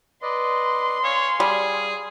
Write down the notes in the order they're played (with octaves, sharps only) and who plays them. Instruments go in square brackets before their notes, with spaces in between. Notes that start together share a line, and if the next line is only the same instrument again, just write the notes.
[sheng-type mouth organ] B4 D5 D#5 [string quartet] C6
[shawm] C#5 [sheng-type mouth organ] F5 G#5
[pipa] G3 [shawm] G#4